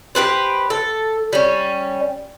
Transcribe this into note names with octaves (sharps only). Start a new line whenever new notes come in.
G4 G#4 B4 C5
A4
G3 C#4